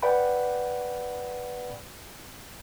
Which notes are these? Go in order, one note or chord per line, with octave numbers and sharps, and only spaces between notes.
B4 D5 F#5 G5 B5